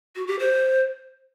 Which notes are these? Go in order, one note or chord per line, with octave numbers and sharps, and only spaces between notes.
F#4
G4
C5